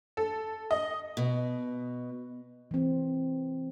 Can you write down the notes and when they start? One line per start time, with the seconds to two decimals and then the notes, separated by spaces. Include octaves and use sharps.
0.17 A4
0.71 D#5
1.17 B2
2.71 E3 C4